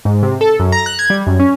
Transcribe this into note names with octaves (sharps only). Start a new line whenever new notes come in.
G#2
C3
A4
F#2
A#5
F#6
G#6
G3
F#2
C#4